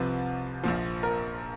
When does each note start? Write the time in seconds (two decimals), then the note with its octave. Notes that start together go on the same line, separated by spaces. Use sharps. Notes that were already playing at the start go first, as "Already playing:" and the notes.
Already playing: C2 C3 F3 B4
0.63 A#1 A#2 F3
1.03 A#4